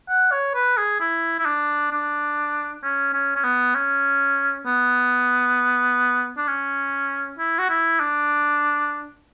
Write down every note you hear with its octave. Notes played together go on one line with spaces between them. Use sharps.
F#5
C#5
B4
G#4
E4
E4
D4
D4
C#4
C#4
C#4
B3
C#4
B3
D4
C#4
E4
F#4
E4
D4